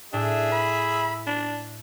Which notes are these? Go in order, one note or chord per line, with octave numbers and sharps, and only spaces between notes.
A2 D4 G#4 E5
B5
D4